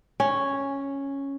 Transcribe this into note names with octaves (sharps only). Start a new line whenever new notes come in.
C#4